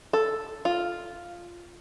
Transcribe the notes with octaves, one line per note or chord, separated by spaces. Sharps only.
A4
F4